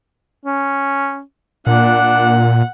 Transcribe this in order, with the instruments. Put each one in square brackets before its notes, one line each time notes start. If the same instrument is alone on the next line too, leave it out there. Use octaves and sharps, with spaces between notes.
[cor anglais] C#4
[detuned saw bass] A#2 [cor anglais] D4 [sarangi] F#5